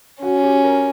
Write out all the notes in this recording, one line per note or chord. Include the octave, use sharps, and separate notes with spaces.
C#4 F#4
G4
A#4